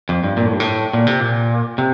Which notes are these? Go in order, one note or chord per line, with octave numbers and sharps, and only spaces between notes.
F2
G2
A#2
A2
G2
A2
A#2
C3
A#2
C3